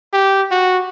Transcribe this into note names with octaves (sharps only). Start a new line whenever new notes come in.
G4
F#4